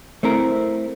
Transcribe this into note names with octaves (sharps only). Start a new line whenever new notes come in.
A3 C4 E4 A#4